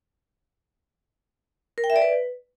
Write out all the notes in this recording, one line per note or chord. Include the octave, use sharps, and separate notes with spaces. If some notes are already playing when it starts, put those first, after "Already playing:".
A#4
G5
E5
D5
B4